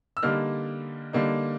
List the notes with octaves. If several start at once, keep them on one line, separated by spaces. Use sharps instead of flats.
E6
D3 G3 A#3 D#4 F6
D3 G3 A#3 D#4